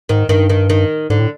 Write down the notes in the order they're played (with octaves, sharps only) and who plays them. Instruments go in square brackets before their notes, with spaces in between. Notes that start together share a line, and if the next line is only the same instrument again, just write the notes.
[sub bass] G#2 [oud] D#3
[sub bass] G2 [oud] D#3
[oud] D#3
D#3
[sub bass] G#2 [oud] D3
[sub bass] A2